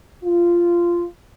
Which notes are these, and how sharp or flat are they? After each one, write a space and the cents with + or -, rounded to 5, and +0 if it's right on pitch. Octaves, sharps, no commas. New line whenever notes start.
F4 -15